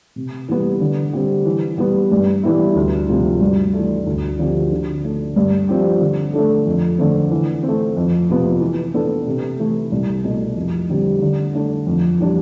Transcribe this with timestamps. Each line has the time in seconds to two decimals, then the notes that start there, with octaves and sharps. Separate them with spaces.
0.16 C3
0.48 E3 G3 B3
0.80 D3
1.13 G3 C4
1.45 E3
1.78 G3 B3
2.11 G2
2.43 E3 G3 B3 E4
2.75 D2
3.08 C3 F3 A3
3.41 G2
3.73 A3
3.78 E3
4.06 D2
4.39 D3 F3 C4 G4
4.71 D3
5.04 A3 D4
5.36 G2
5.69 F3 C4 G4
6.01 D3
6.33 A3 D4 A4
6.67 F2
6.98 D3 A3 C4
7.31 E3
7.63 A3 C4
7.97 F2
8.29 C3 F3 B3
8.61 E3
8.94 B3 D4 A4
9.26 C3
9.59 E3 A3 E4
9.92 C2
10.24 B2 A3
10.56 F2
10.89 D3 G3 C4
11.22 D3
11.54 A3 D4
11.87 F2
12.19 E3 G3 D4